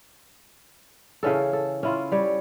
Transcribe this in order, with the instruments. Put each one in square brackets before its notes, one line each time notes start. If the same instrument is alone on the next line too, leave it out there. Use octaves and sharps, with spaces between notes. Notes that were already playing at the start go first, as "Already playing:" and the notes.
[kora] C#3 E3 C#4 A4
A4
C#4 E4 F4
G3 C#5